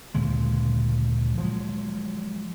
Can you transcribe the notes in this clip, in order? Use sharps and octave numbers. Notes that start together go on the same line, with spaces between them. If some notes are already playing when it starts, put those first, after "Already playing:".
D2 A#2 C#3 G#3
F3 F#3 G#3